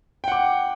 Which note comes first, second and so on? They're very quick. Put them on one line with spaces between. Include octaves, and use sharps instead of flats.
G5 F#5 D6